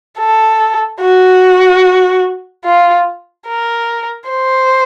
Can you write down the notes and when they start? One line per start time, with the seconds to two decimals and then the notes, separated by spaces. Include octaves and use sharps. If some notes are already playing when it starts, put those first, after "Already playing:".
0.19 A4
1.01 F#4
2.65 F4
3.48 A#4
4.29 C5